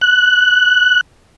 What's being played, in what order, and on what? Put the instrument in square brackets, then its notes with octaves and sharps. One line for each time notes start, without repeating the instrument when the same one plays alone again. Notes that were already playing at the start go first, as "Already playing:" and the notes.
[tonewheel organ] F#6